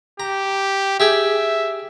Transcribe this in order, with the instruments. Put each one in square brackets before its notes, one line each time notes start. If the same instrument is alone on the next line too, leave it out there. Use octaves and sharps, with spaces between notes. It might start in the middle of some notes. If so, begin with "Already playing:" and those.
[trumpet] G4 [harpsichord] A#5
[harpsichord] G4 G#4 G5 [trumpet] E5